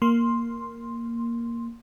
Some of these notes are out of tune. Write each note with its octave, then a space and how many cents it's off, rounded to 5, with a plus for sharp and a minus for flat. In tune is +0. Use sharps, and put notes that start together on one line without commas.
A#3 +0 C6 +5